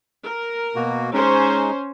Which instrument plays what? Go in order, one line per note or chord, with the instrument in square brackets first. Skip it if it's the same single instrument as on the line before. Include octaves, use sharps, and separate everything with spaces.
[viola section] A#4
[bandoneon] B2 A#3 F#4
[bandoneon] G#3 D#4 [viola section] C#4 C5